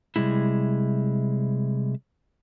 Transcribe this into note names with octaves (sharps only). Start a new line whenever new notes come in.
C3 G3 G#3 E4